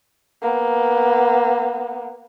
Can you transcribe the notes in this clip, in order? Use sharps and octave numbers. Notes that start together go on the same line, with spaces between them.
A#3 B3